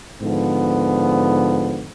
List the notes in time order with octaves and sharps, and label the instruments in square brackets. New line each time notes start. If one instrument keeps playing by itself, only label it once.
[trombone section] G#2 D3 F3 B3